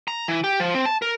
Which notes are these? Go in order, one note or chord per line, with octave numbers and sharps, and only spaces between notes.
A#5
E3
G4
F3
C4
A5
A#4